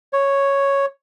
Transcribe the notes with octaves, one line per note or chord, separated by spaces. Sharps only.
C#5